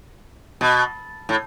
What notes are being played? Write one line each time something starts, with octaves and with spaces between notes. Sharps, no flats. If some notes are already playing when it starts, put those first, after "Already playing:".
B2
A2